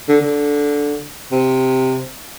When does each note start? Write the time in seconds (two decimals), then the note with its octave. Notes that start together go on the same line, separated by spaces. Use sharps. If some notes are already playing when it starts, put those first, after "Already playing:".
0.08 D3
0.21 D3
1.32 C3